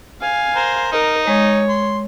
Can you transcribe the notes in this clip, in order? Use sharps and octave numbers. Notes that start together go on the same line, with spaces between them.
F5 G#5
A#4 C5
D#4 A#4
G#3 C#5
C6